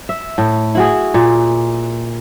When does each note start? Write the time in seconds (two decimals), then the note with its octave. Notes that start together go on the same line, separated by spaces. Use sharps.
0.09 E5
0.38 A2
0.75 E4 F#4 G#4
1.14 A#2